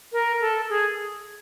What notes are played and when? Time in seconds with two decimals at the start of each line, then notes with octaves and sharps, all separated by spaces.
0.13 A#4
0.41 A4
0.70 G#4